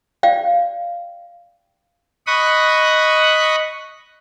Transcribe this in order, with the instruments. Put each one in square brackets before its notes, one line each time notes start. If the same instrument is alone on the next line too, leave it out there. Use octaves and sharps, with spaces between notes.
[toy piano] D5 F5 G5
[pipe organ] D#5 B5 C#6 D#6 F#6